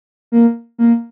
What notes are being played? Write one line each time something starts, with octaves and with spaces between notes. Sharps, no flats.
A#3
A#3